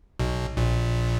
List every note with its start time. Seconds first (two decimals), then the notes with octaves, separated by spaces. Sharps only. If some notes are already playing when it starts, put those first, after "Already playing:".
0.19 B1 B2
0.57 A#1 A#2